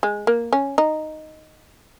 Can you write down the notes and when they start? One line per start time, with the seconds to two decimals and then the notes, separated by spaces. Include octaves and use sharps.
0.03 G#3
0.27 A#3
0.53 C#4
0.78 D#4